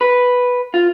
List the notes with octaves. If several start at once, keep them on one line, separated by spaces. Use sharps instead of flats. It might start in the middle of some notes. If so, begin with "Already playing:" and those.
B4
F4